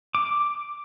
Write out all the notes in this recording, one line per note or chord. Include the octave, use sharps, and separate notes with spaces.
D6